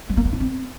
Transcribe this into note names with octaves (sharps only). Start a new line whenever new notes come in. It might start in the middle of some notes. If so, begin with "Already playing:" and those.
G#3
A#3
B3
D4
C4